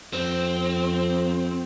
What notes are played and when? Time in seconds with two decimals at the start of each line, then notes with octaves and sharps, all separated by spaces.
0.13 F2 C4